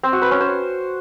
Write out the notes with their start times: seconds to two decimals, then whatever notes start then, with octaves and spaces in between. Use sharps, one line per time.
0.03 C4
0.13 F#4
0.22 B4
0.31 C#4
0.40 C5